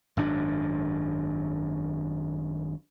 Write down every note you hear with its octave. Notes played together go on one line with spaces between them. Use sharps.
G#1 F#2 D4